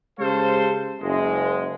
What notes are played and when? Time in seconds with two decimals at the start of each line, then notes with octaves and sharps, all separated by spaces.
0.19 C#3 G#3 G4 A4 C5 F5
1.01 F#1 G#3